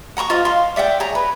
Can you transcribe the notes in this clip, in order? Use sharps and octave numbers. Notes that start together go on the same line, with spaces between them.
F#5 A#5 C6 C#6
F4 C5 D#5 F5
F5 C6
D5 E5 F#5 G5
G#4 C#5 A#5
B4